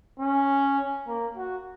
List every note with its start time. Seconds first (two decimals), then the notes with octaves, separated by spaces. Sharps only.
0.20 C#4
1.07 A#3
1.36 F#4